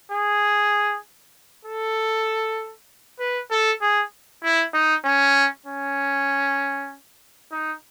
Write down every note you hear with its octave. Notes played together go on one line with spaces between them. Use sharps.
G#4
A4
B4
A4
G#4
E4
D#4
C#4
C#4
D#4